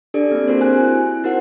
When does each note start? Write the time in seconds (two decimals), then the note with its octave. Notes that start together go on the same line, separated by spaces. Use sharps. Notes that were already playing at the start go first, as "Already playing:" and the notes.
0.14 D4 G4 A4 D5
0.32 A#3 C4
0.48 C4 F#4 G#4 A#4 C5
0.61 G#5 F#6
0.80 E4
1.24 D#4 F#4 A#4 C5 F#5